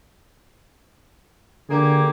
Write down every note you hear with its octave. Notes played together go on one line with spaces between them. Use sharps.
D3 A#3 G4 G#4